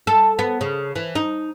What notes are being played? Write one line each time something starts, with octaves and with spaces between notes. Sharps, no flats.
A4
B3
C#3
E3
D#4